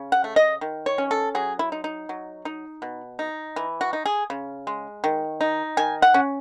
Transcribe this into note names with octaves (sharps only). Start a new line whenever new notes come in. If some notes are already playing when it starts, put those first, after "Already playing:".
Already playing: C#3
F#5
A3
D#5
D#3
C#5
C#4
A4
F#3 G#4
E4
D#4
D#4
F#3
D#4
B2
D#4
E3
F#4
D#4
G#4
C#3
G#3
D#3
D#4
D#3 G#5
F#5
C#4